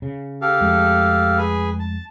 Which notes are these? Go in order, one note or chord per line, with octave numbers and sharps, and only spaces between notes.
C#3
G4 A4 F5
F2 G#3 A3
G#4 B4 G#5
A5